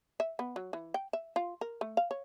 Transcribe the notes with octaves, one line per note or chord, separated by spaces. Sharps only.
E5
B3
F#3
E3
G5
E5
F4
A#4
A3
F5
C#5